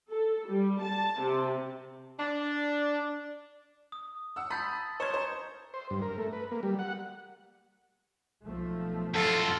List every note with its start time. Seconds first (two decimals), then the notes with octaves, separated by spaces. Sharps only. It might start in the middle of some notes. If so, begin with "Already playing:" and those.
0.11 A4
0.47 G3
0.82 A5
1.21 C3
2.18 D4
3.92 D#6
4.36 F#5 E6
4.50 A5 B5 D#6 G6 A6 B6
5.00 C5 C#5 C#6 G#6 C#7 E7
5.14 C5 A#5
5.74 C5
5.90 G2
6.02 A#4
6.18 A3
6.33 B4
6.51 A#3
6.63 G3
6.79 F#5
8.46 B1 F3 A3
9.14 F#2 F4 A4